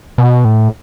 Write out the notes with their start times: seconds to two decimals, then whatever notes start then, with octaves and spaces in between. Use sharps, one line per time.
0.18 B2
0.45 A2